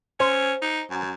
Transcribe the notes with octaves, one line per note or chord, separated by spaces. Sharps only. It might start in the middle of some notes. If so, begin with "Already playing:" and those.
C#4 C5
D#4
F#2